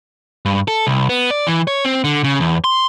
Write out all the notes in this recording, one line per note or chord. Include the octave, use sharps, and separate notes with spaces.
G2
A4
C2
B3
D5
E3
C#5
C4
D3
C#3
E2
C6